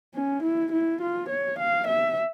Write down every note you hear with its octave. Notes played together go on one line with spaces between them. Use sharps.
C#4
E4
E4
F4
C#5
F5
E5